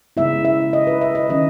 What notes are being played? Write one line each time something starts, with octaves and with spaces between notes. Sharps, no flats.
C#3 G#3 B3 E4 E5
E5
D#5
B4
E5
D#5
D#3 F#3 C#4 D#5